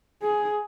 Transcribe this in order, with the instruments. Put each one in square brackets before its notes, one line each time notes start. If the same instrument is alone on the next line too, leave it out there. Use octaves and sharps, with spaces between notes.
[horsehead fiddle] G#4